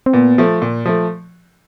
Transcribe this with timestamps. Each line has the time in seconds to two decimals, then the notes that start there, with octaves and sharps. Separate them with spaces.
0.06 C4
0.13 A#2 B3
0.38 F3 A3
0.62 A#2
0.85 F3 A3